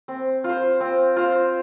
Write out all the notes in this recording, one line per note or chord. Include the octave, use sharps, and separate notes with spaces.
C4
F4 C5
C4
F4 C5